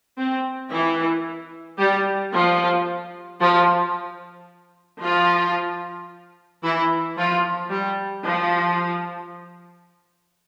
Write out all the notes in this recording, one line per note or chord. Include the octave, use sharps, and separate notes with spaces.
C4
E3 E4
G3 G4
F3 F4
F3 F4
F3 F4
E3 E4
F3 F4
G3
F3